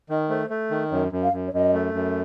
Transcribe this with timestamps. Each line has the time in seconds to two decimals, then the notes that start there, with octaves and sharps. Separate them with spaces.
0.09 D#3 D#5
0.29 A3 C5
0.50 A3
0.71 D#3
0.80 D#5
0.91 F#2 C#5
1.12 F#2
1.23 F5
1.33 F#2
1.46 C#5
1.53 F#2 D#5
1.74 A3
1.94 F#2